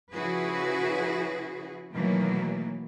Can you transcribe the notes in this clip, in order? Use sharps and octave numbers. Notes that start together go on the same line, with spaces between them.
C#3 F3 E4 F#4 G#4 B4
B2 D#3 E3 F#3 A3 A#3